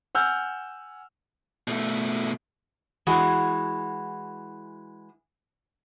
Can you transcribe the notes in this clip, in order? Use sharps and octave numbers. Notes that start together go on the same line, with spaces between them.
F#5 G#5 E6 F6 G6
B2 A3
E3 G#3 F#4